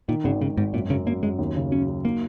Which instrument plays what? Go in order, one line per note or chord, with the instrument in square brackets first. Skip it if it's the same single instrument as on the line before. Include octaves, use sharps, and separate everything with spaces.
[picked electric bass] A#2 [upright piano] D#3
[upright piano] G#1 [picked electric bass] C#3
[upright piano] G#1 [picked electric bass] C#3
[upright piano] G#1 [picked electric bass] G#2
[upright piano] F#2 [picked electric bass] A#2
[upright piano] F#2 [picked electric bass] C#3
[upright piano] F#2 [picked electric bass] A#3
[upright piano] F#2 [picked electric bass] G#3
[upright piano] D#2
C#3
[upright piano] F#3 [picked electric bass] C#4
[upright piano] F#3
[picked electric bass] A#3 [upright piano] D#4